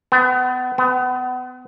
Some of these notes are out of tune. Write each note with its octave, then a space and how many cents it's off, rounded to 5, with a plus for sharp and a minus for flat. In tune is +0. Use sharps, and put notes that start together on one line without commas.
B3 +35
B3 +35